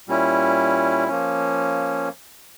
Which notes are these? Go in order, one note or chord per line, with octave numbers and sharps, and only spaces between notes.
A#2 G3 C#4 E4
F3 A#3 C#4